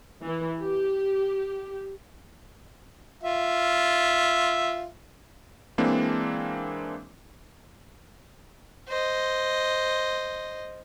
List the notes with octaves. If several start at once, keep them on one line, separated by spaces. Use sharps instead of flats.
E3
G4
F4 E5
E3 G#3 A#3 C4 D4
C5 D#5